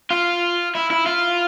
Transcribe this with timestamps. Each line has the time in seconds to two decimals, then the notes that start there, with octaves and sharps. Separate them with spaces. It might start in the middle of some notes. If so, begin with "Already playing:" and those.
0.10 F4
0.75 E4
0.91 E4
1.06 F4